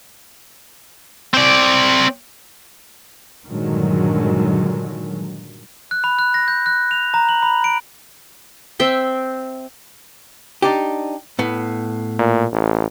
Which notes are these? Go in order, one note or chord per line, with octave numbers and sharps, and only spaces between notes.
C4 D5
G2 A#2 D3 D#3 F#3 G#3
F#6
B5
F#6
A#6
G6
F#6
F7
A#5
F#7
B5
D7
C4 E5 G5
D4 D#4 G4
A2 B3
A#2
A1